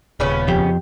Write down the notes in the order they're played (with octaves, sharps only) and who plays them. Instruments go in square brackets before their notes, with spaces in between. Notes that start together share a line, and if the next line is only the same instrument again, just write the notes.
[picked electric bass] D#1 [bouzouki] C#3 B3 C#4
[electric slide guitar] F2 [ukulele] G4